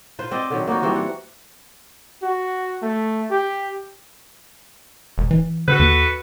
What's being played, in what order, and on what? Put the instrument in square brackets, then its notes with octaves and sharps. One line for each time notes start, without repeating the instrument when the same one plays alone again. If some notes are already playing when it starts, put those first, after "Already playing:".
[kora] F4 B4 C5
C4 D5 D#5
D3 D#3 F#3
A#3 B3 D#4 F#4
E3 G3 C4 F#4
F#5
[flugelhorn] F#4
A3
G4
[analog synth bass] E1
E3
[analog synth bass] D3 [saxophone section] F#4 A4 B4
[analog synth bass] D#2